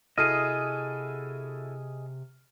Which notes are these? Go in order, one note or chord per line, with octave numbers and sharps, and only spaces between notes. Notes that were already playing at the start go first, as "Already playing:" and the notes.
C3 E4 F#4 G#4 A4 D#5 F6 D#7